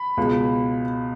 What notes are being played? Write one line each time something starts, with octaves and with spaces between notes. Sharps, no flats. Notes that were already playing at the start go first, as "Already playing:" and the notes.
Already playing: B5
C#2 B2 G#3